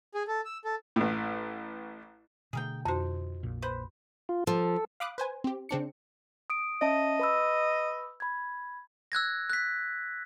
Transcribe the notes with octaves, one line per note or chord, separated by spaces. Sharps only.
G#4
A4
E6
A4
A1 A2
B2 D3 A3 G#4 A#4 G5
F2 D#4 F#4 C5
A#1 A#2
B4 C5
F4
F3 A4
F5 B5 D6 D#6 F#6
B4 C5 G#5
C4 G4
C#3 C4 D4 C#7
D#6 D7
C#4 D#5 E5 A5
B4 B5 E6
B5 G#6
E6 F#6 G#6 A#6
F#6 B6